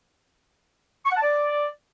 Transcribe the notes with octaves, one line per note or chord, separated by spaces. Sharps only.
C#6
F#5
A5
D5